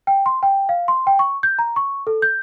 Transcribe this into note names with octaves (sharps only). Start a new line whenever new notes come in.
G5
C6
G5
F5
C6
G5
C#6
G6
A#5
C#6
A4
G6